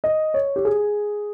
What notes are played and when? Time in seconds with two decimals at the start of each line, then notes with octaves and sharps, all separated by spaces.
0.04 D#5
0.34 C#5
0.56 G4
0.65 G#4